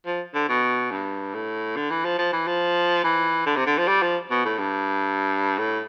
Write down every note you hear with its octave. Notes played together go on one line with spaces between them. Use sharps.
F3
D3
B2
G2
A2
D3
E3
F3
F3
E3
F3
E3
D3
C3
D3
F3
G3
F3
B2
A2
G2
A2